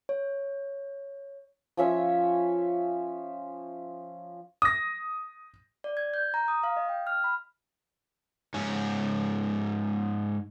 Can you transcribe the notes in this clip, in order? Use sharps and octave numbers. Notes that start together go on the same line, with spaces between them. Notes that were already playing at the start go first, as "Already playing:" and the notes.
C#5
F3 C#4 E5
D#6 A#6
D5
G#6
G6
A#5
D#6
F5
D#5
G5
F6
B5
G#2 C#4